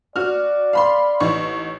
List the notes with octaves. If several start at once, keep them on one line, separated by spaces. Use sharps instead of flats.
F#4 D5 F6
F5 B5 C6
A1 D#4 C#6